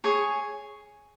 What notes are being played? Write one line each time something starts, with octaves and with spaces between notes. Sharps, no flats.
G#4 C#5 G#5 C#6